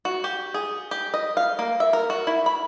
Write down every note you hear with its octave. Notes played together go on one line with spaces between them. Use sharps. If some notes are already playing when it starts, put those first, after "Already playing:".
F#4
G4
G#4
G4
D#5
F5
A#3
E5
A#4
F#4
E4
B5